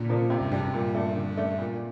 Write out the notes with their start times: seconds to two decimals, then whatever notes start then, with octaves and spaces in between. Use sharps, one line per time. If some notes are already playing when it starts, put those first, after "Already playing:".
Already playing: A#2 D3
0.09 F3 A#3 D4
0.30 C3
0.41 G2
0.51 G2 G3 D4
0.63 G2
0.74 A#2
0.95 A3 D4
1.16 D3
1.37 A3 D4
1.58 A#2